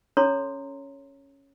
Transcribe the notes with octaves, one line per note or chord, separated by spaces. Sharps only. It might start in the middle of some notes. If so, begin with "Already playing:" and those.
C#4 A4 C#5 A#5 C6